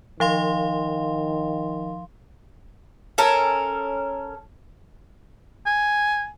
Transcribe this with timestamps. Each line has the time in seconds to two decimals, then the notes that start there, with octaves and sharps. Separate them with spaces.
0.20 D#3 F3 F5 C6
3.18 C#4 A4 A#4
5.66 G#5